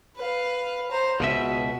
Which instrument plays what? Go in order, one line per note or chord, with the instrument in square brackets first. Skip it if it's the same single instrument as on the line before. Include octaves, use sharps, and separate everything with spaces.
[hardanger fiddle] B4 F5
C5 A#5
[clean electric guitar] C#2 B2 E5 [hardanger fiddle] F#4